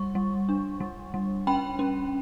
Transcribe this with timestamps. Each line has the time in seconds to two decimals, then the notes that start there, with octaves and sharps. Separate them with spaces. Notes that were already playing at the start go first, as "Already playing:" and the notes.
Already playing: G3 C#6
0.15 G3
0.49 D4
0.80 G3
1.14 G3
1.47 C#4 G5 B5
1.79 C#4